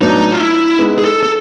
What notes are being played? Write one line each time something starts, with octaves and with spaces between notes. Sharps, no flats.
A2 F#3 B3 D4 D#4
F4
E4
G#3 B3 D#4
G#4
A4
A4